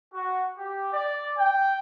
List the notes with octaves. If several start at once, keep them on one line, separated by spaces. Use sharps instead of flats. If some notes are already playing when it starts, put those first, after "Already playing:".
F#4
G4
D5
G5